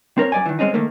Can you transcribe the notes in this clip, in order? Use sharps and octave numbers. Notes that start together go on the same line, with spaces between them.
C4 A#4 C#5
F#2 D5 G#5
D#3 E3
G#3 C4 C#4 D#4
D#3 A3 A#3